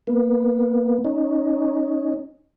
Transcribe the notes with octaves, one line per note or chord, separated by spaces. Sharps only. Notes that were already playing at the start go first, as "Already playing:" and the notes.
A#3 B3
C#4 D#4